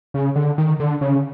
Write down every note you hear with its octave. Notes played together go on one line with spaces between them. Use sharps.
C#3
D3
D#3
D3
C#3